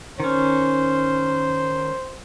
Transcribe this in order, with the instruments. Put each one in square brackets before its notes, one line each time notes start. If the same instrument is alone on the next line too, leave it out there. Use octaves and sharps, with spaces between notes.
[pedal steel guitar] D#3 C#4 [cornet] C5